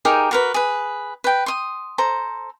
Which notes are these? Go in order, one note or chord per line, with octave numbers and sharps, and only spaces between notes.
D#4 G4 G#4 A#4
F#4 A#4 B4
G#4 B4
B4 G5
C6 D#6
A4 C5 A#5